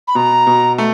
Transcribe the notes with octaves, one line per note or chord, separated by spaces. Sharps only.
B5
B2 A#5
B2
A3